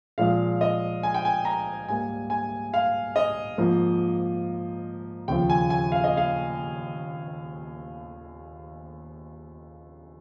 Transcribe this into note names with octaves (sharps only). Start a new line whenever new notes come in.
A#2 F3 G#3 F5
D#5
G#5
G5
G#5
A#5
G#2 G3 A#3 G#5
G#5
F5
D#5
G#2 F3 A#3
D#2 C#3 F3 G5
G#5
G#5
F5
D#5
F5